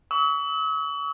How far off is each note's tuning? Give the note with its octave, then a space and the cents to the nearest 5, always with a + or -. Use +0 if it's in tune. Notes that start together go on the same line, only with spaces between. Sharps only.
C#6 +40 E6 -45